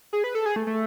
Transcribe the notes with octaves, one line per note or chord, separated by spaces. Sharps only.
G#4
B4
A4
G#4
A3
A3